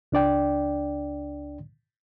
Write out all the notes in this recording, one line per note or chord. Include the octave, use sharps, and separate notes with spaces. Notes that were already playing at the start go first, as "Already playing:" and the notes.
C#2 D4 D5 G5